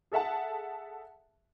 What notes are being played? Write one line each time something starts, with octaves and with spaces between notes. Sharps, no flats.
G#4 A4 E5 F#5 A5